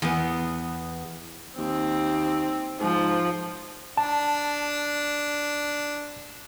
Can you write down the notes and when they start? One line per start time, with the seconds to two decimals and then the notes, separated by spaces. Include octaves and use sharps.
0.02 E2 B3
1.58 D#2 C4
2.81 G#2 F3
3.97 D4 A5